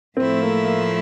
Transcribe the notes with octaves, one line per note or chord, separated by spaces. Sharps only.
A2 F3 A3 C4 E4
A#3
A#3